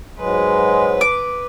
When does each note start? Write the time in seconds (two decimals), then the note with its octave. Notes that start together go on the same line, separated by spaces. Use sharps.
0.19 G#2 F#3 G#3 B4
1.01 D6